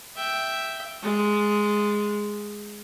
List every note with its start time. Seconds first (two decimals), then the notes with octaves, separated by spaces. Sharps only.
0.17 E5 G5
1.03 G#3